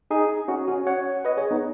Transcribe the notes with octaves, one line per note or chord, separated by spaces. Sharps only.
D#4 G#4
C#4 F#4
C#4 F#4
C#5 F#5
B4 D#5
G#4 C#5
B3 D#4